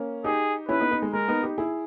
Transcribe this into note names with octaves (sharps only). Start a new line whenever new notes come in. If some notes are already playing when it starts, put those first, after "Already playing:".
Already playing: A#3 C#4
D#4 G4 G#4
C#4 E4 B4
B3 D#4
B3 D#4
G#3
G#3 A#4
B3 D#4
D#4 G4
E4 G#4